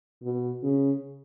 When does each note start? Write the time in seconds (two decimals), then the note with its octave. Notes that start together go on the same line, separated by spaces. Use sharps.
0.23 B2
0.63 C#3